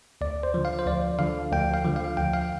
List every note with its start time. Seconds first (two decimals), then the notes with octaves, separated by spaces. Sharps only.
0.21 D2 D5
0.43 C5
0.54 D3 F3
0.65 F5
0.79 C5
0.86 D2 D5
1.19 D3 F3 F5
1.52 D2 G5
1.74 F5
1.85 D3 F3
1.96 F5
2.17 D2 G5
2.33 F5